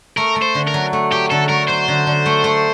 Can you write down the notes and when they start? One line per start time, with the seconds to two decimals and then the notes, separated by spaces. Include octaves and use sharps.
0.17 A3 A#4
0.36 A3
0.42 C5
0.55 D3
0.67 A#4
0.74 F#3
0.93 A3
1.12 F#3 G4
1.31 D3 A4
1.49 A3 A#4
1.68 F#3 C5
1.88 D3
2.07 D3
2.26 A3
2.44 A3